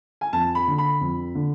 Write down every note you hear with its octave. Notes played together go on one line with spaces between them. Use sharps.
G#5
F2 A5
B5
D3
B5
F2
D3